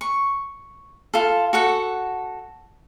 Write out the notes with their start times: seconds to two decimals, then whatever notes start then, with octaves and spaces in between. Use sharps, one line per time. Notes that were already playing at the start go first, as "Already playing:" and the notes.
0.01 C#6
1.14 F4 A4
1.53 F#4 A4 F#5